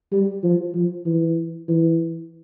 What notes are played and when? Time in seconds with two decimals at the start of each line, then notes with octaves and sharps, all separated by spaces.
0.12 G3
0.43 F3
0.74 F3
1.06 E3
1.69 E3